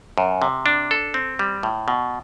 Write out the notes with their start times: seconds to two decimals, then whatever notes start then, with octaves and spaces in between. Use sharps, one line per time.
0.18 F#2
0.42 C3
0.66 D4
0.91 A4
1.14 C4
1.39 G3
1.63 A2
1.88 B2